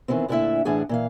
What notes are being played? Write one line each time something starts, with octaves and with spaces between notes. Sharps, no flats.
D#3 E3 G#3 B3 C4
D2 A#2 D3 D4 E4 E5
A2 E3 D4 G#4 F#5
A#2 E3 F5